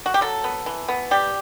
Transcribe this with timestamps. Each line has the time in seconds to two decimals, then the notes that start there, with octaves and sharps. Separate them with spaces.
0.06 F#4
0.14 G4
0.21 F#3 A4
0.44 B3
0.66 E3
0.88 B3
1.11 G3 G4